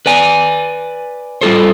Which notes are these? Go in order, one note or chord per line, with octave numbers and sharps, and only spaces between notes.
B4 D5 G#5
G3 F4 A4 C5